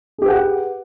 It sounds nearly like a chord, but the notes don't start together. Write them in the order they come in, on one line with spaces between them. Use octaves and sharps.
G#4 G4 B4 F#5